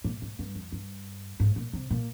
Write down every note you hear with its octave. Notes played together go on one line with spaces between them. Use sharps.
A#2
G#2
G2
F2
G2
G#2
A#2
C3
A#2